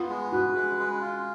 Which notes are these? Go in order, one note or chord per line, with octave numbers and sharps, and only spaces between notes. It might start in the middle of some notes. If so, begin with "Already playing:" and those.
Already playing: B3 F4
G#3
F#4 B4
G#3
G#3
F4